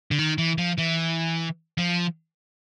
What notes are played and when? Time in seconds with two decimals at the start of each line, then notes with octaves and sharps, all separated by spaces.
0.11 D3
0.19 D#3
0.38 E3
0.58 F3
0.78 E3
1.78 F3